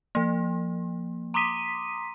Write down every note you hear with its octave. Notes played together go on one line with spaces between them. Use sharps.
F3 A#3
A#5 C6 D6 D#6 B6 D#7